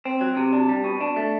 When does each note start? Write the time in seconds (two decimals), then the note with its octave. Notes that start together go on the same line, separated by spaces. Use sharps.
0.05 C4
0.21 F#3
0.37 C3
0.52 D4
0.69 G3
0.84 B2
1.01 D4
1.16 A3